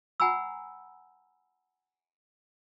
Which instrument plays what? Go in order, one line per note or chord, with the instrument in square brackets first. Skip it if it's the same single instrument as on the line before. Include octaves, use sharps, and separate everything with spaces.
[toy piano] F#5 G#5 A#5 B5 E6